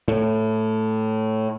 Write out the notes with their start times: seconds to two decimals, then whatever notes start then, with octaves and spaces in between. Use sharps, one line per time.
0.08 A2